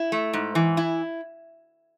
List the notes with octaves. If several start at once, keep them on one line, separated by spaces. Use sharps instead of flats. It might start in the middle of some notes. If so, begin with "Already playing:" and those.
Already playing: E4
A3
G#2
E3
E4